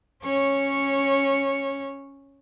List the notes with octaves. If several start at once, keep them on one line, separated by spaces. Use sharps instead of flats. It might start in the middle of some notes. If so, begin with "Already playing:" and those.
C#4 C#5